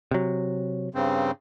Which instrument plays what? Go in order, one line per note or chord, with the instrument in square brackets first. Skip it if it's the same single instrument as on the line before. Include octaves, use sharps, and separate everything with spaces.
[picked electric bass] C3 F#3
[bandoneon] G2 C#3 C4